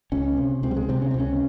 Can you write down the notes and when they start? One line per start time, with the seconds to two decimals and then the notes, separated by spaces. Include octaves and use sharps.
0.12 C#2 C#4
0.37 C3
0.63 C#2 C4
0.71 G3
0.77 G#3
0.89 C3 C4
1.02 C#4
1.11 C4
1.14 C#2
1.19 C#4